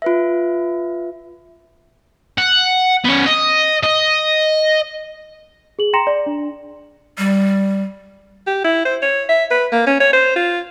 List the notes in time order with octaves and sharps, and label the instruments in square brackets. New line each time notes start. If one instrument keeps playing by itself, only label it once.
[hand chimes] F4 B4 E5
[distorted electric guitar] F#5
B3 C#4
D#5
D#5
[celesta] G#4 F#7
G5 A#5 C6 A#6 C#7 E7
D5
D4
[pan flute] G3
[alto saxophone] G4
E4
C5
C#5
E5
B4
A#3
C#4
C#5
C5
F4